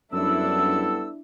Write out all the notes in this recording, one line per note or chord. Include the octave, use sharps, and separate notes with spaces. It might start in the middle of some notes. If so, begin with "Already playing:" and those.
F#2 G3 B3 D4 E4 A4 E6